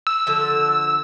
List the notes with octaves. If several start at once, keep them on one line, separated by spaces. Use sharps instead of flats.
E6
D3 F3